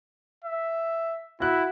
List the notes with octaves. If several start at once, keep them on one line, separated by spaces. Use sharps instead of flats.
E5
E4 F#4 F#6